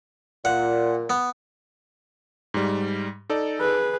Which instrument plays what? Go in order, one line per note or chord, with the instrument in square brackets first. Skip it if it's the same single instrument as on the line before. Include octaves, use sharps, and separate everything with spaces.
[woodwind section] A#2 [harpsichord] F#5
[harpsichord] B3
[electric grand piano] G#2 G3
D#4 A4 D5
[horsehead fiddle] G#4 B4